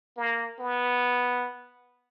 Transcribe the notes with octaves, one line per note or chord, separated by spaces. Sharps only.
A#3
B3